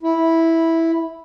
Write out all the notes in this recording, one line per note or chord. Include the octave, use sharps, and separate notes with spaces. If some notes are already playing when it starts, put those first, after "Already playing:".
E4